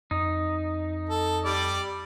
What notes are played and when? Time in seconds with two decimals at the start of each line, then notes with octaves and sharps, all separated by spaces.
0.11 F2 D#4
1.10 A4
1.45 G3 D5